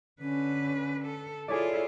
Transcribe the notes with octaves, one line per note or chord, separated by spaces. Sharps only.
D3 C#4 B4
A4
E4 F4 G#4 A4 C#5 D5